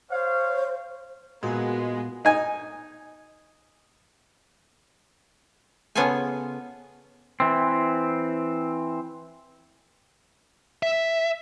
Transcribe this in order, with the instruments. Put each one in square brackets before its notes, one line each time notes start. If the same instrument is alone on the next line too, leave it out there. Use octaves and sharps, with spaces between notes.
[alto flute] C5 [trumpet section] C#5 F5
[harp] A#2 [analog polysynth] G#3 [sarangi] B3 [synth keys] F#4
[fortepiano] D#4 G#5
[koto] C#3 B3 F4 G#4 A4 G#5
[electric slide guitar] E3 C4
[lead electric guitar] E5